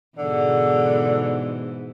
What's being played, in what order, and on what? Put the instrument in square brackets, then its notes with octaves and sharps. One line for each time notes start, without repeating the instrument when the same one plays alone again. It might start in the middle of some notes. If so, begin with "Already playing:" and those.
[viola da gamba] G#2 B2 E3 [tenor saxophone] D3